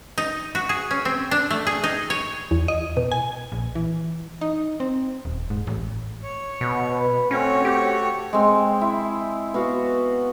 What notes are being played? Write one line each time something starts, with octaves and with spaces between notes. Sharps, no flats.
D#4
F#4
G#4
C#4
C4
D4
A3
G#4
D#4
C#5
E2
D#5
B2
G#5
A#1
E3
D#4
C4
D#1
G#2
A1
C#5
B2
B4
A3 C4 C#4 F#4 C#5
G4
G#3 C4
E4
B3 F#4 F5